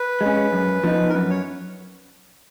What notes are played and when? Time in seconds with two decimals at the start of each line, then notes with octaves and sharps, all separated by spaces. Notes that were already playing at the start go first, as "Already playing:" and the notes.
Already playing: B4
0.21 G#3 C#4
0.53 F#2
0.84 F3 B3 D#4
1.09 A#4
1.14 F#2 B4
1.30 C#5